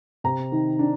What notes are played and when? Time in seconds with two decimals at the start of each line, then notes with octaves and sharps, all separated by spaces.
0.24 C3 A#5
0.52 D#3
0.79 D4